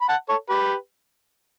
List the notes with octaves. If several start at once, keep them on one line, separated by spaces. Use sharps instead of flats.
B5
F#5 A5
A4 C#5
G4 B4